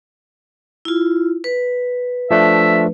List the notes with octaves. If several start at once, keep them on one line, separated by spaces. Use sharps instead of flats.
E4 F4
B4
F3 A3 D4 E5